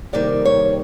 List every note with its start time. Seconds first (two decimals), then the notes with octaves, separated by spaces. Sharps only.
0.13 F2 C3 D#3 G3 A#3 D5
0.45 C#5